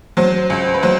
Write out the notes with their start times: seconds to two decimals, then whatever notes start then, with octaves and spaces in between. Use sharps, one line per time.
0.17 F#3 C5
0.50 C#2
0.74 B4
0.83 F#3 C5